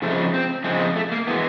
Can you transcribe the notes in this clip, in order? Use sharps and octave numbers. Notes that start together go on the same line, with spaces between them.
F2 C#3 F3 G#3 A3
C4
F2 C#3 F3 G#3 C4
A3
A#3
E3 G#3 B3